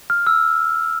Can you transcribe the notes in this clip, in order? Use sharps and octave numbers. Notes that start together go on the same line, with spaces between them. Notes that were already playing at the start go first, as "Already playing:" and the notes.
F6
E6